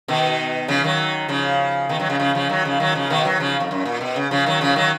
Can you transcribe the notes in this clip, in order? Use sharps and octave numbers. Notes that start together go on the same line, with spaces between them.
B2 D#3
C#3 F3
D#3 F#3
C#3 F3
B2 D#3
D#3 F#3
C#3 F3
C#3 F3
C#3 F3
D#3 F#3
C#3 F3
D#3 F#3
C#3 F3
B2 D#3
D#3 F#3
C#3 F3
F2
F#2
A#2
B2
C#3
C#3 F3
D#3 F#3
C#3 F3
D#3 F#3